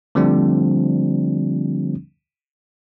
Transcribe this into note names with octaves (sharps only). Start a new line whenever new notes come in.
D3 F3 G3 A3 C4 D4